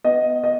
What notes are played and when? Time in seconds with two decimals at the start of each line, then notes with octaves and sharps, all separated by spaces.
0.04 B3 D#5
0.44 D#5